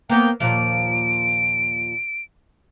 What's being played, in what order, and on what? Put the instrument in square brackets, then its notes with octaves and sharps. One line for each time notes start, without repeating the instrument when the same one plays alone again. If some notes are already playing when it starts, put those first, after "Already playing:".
[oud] A#3 B3 [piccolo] G5
[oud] D#2 A#2 F3 [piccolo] D7